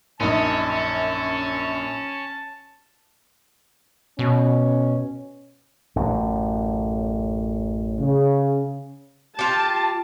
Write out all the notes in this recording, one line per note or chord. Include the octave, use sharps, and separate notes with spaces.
A#1 F#2 C#4 D#4 A5
B2 C#4
A1 F#2
C#3
F4 G4 A5